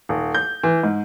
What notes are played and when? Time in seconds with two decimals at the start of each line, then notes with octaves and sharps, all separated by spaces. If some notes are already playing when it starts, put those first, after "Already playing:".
0.09 D#1
0.35 G6
0.63 E3
0.83 G#2